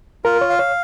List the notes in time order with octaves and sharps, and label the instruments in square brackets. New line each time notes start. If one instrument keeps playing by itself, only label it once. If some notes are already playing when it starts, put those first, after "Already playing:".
[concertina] F4 [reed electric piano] A#4
[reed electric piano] C#5
[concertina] F5
[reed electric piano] C#5